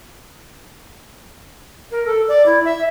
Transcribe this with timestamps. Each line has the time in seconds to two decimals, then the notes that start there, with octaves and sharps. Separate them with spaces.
1.92 A#4
2.06 A4
2.28 D5
2.46 E4
2.65 E5